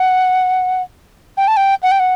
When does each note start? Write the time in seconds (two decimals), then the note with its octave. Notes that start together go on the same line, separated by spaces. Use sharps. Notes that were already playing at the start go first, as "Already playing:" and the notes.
Already playing: F#5
1.37 G5
1.48 A5
1.57 G5
1.83 F#5
1.91 G5
2.00 F#5